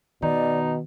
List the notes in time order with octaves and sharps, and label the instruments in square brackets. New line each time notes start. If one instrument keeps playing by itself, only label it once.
[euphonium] B2 [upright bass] D#3 [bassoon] D#4 [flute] D5